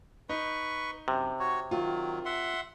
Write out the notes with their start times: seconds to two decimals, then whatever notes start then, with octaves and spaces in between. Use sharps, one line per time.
0.29 D#4 B4 C#6
1.08 F#2 C3
1.40 F#4 C#5
1.71 D#3 F#3 F4
2.26 E5 F#5 C6